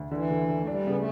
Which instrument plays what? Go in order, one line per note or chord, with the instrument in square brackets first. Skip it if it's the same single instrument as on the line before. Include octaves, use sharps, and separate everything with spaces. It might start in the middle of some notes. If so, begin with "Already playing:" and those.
Already playing: [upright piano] D2
[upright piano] D3 [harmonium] E3
[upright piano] D3
D3
[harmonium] A3
[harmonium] G3 [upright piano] D4
[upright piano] C#3 [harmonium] B3
[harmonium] A3